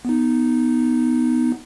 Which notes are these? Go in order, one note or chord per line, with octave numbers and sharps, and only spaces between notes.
B3 D#4